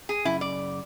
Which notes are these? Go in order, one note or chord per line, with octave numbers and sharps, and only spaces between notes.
G#4
F#2 C#3 E4
D5